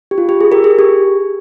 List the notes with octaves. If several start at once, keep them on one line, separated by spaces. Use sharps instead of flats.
G4
F4
G4
G#4
G4 A#4
G#4
G4